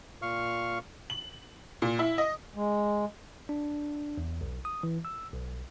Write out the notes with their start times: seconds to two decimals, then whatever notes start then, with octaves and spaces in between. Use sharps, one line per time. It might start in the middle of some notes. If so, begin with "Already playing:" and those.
0.22 A#2 F5 C#6 F6
1.10 F#7
1.82 A#2
1.99 E4
2.18 D#5
2.56 G#3
3.49 D4
4.17 E2
4.41 B1
4.65 D#6
4.83 E3
5.05 E6
5.34 B1